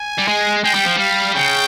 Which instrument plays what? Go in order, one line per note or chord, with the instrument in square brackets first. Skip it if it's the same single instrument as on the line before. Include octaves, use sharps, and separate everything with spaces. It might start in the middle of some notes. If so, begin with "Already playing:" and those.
Already playing: [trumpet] G#5
[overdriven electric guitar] G3
G#3
[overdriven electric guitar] G#3 [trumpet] G5
[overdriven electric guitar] G3
F3
[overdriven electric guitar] G3 [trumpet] F5
[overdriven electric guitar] C#3 [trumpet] G5